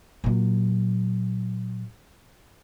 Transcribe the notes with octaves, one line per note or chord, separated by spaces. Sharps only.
A#2 F#3